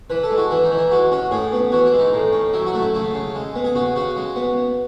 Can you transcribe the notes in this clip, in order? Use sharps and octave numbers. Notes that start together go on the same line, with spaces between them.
E3 B4
A4
G#3
F#4
E3 E4
D#4
E3
E4
G#3 F#4
C#4 F#4
A2 G#4
B3
E3 F#4
E4
G#3
D#4
A2
C#4
F#3 E4
F#4
A3
E4
C#3 E4
C#3
G#3
B3
G#4
C#3 F#4
C#3 F#4
G#3
B3